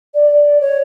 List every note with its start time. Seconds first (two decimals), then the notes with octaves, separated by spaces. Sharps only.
0.14 D5
0.60 C#5